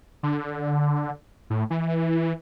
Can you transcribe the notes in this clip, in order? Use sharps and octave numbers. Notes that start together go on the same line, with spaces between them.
D3
A2
E3